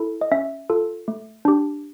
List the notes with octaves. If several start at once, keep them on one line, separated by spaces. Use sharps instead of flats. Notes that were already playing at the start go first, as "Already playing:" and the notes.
Already playing: E4 A4
D#5
C#4 E5
F4 A4
A3
D4 G4